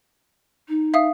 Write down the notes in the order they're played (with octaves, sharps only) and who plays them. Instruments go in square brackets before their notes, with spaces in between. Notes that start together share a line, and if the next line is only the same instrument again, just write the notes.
[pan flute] D#4
[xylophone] E5 F5 D#6